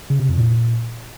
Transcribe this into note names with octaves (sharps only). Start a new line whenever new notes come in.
C#3
C3
F2
A#2